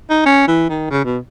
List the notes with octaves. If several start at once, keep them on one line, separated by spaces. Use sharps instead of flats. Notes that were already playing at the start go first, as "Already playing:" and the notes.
D#4
C#4
E3
D#3
C#3
B2